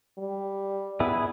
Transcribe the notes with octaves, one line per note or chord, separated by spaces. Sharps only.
G3
B3 E4 G#4